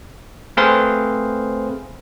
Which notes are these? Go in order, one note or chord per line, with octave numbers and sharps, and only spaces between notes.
A3 C4 G#4 B4 C5 F5